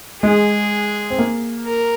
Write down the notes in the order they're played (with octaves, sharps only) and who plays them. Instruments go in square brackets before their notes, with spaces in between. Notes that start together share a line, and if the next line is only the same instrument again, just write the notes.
[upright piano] G#3 [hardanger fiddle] G#4
[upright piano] C4
A#3
[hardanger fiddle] A#4